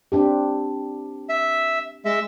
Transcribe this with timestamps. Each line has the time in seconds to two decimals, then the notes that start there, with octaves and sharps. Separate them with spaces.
0.12 C4 D4 G4
1.29 E5
2.05 G#3 E5